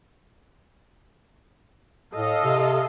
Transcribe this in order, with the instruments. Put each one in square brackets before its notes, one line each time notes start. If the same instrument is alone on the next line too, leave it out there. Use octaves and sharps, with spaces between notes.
[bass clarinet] A2 [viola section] A4 D#5 F5
[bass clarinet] C3